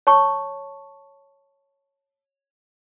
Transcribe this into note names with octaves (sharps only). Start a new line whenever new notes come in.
C#5 A5 C#6